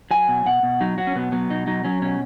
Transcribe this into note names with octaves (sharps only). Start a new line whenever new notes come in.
F#3 G#5
B2
B2 F#5
B2
F#3 D#4
F#3 F#4
C#4
B2 B3
F#3 B3
B2 D#4
F#3 D#4
F#3 C#4
B2 C#4